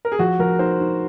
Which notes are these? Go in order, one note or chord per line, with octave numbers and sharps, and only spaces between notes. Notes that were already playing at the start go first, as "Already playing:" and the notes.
A#4
G#4
F3 F#4
F3 A#4
D#4 C5
D#4